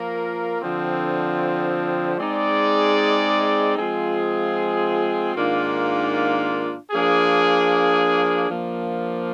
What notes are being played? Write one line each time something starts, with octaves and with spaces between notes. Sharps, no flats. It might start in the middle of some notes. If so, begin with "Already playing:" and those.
Already playing: F3 A#3 F4 A#4
D3 F3 C4
G#3 C4 D#4 G#4 D5
F3 G#3 C4 F4 G#4
G#2 D#3 A#3 D4 F4
F3 A#3 D4 G#4
F3 A#3 D4